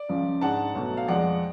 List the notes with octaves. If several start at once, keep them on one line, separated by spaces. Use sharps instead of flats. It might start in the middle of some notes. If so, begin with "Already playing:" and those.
Already playing: D5
C#2 C#3 F3
G#2 G#3 D4 F#5 A5
B1 B2 F#3 A3
F5
F2 F3 G#3 D5 F#5